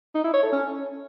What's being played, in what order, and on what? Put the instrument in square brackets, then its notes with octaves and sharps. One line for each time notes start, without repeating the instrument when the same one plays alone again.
[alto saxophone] D#4
E4
C#5
A4
C#4